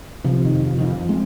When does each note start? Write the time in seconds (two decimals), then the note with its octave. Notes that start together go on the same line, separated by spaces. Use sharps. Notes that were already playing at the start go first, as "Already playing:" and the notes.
0.24 C3 F3
0.45 D#3
0.53 F2
0.67 F3
0.79 F2 D#3
0.88 F3
1.09 G#3 C4